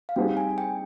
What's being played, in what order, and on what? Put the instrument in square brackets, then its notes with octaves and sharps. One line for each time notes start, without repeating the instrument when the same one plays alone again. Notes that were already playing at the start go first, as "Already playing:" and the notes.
[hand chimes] F5
[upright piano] G3 C4 D#4 G#4 C5 [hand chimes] G5
[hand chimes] G#5
G5